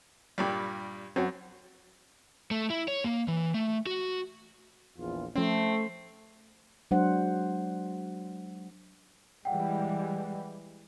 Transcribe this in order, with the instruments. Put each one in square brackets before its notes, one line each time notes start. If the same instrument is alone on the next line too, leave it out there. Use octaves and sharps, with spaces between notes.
[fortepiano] G2 A#2 G3
[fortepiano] F#2 [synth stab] C4 C#4 F#4
[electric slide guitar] A3
E4
C#5
A#3
E3
A3
F#4
[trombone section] A#1 E2 F4
[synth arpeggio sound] F3 C#4 [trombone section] A3 [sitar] C4
[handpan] F#3 G#3 D4 C5 F#5
[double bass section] E3 G3 G#3 [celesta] F#5 G5